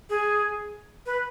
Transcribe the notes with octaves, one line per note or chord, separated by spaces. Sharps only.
G#4
B4